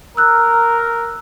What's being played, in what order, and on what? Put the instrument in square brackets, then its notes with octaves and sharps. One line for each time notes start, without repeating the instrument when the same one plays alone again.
[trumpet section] A#4 [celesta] E6 F#6